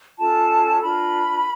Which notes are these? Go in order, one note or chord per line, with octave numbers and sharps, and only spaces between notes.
C#4 F4 A4 A5
D4 F4 A#4 B5